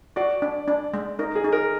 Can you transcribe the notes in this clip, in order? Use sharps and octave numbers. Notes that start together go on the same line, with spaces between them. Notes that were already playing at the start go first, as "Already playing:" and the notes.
F#4 D5
D4
D4
G#3
D#4 A#4
G#4
D#4
A#4